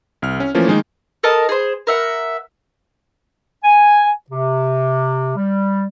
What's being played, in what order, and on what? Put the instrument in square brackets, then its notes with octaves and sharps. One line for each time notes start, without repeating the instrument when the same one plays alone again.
[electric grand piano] C2 F6
C#4
E3 F3 A3 A#3 C#4
D#3 G#3 A#3 D#4
[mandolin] A4 A#4 D#5 A5
G#4 C5
A#4 E5 F#5
[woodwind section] G#5
C3
G3